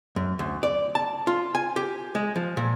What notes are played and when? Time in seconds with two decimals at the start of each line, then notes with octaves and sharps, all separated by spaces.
0.16 F#2
0.39 D2
0.63 D5
0.95 A5
1.27 F4
1.55 G#5
1.76 G4
2.15 G#3
2.36 F3
2.57 A#2